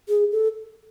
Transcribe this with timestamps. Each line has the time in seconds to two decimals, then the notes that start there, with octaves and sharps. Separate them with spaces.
0.09 G#4
0.32 A4